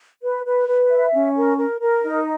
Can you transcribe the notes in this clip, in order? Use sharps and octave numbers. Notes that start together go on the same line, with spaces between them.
B4
B4
B4
E5
C#4
A#4
A#4
A#4
D#4